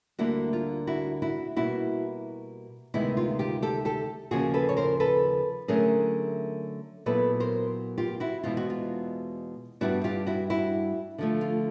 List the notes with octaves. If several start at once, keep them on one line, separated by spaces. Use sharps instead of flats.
D2 D3 G3 A#3 E4 F#4
F4
E4 F#4
E4 F#4
B2 G3 A#3 E4 F#4
D2 C3 D#3 G#3 B3 E4
F4
F4 G4
G4 A4
G4 A4
D#2 C#3 F3 A#3 F#4 G#4
A4 B4
C#5
A#4 C5
A4 B4
D3 F#3 A3 C#4 E4 G#4 A#4
A#2 F#3 B3 E4 A4 B4
A#4 C5
F4 G4
E4 F#4
E2 B2 G#3 C4 E4 F4
F#4
F4
G2 D#3 G3 B3 D4 E4 F#4
F4 G4
E4 F#4
E4 F#4
D3 F3 A3
F4